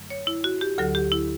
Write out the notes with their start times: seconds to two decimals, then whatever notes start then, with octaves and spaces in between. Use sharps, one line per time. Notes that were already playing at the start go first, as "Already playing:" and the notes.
Already playing: F#2 D3 F#3 A3
0.10 C#5
0.27 E4
0.44 F#4
0.61 G4
0.78 D2 D3 F#3 A4
0.95 G4
1.12 E4